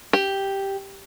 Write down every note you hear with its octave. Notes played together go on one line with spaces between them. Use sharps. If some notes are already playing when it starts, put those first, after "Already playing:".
G4